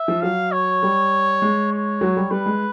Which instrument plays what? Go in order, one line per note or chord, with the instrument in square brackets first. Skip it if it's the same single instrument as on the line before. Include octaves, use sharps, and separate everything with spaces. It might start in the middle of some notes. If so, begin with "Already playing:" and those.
Already playing: [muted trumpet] E5
[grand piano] F3
[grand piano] F#3 [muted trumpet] F5
[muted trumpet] C#5
[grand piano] G3
G#3
[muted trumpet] C#5
[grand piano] F#3
G3
[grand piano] G3 [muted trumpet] B4
[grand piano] G#3